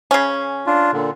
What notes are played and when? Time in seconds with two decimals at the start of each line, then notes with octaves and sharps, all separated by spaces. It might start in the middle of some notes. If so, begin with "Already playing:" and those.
0.11 C#3 C#4
0.67 D4 F4
0.93 A#2 D3